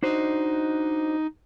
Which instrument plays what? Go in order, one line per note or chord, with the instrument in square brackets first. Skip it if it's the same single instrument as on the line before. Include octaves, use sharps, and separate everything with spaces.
[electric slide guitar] D4 F#4 C5 [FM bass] D#4